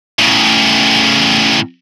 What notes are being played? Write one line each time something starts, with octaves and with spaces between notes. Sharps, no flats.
A2 C#3